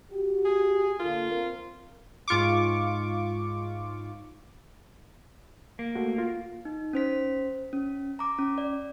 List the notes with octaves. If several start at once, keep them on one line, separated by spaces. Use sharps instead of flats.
F#4 G4
G#4
D3 A#3 F4
C4 A#4
G#2 F4 C#6 D6
A#3
A3 F#4
F4
D#4
C#4 C5 B6
C#4
A#5 D6
C#4
D5